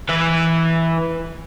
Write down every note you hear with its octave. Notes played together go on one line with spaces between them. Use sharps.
E3 B4